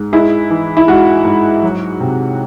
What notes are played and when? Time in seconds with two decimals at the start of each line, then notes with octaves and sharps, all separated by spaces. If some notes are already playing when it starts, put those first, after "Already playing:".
Already playing: G#2
0.13 G#3 E4
0.50 E3
0.77 E4
0.88 G#2 F#4
1.25 G#2
1.62 F#3
2.00 C3